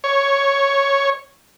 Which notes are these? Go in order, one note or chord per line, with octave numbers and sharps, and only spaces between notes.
C#5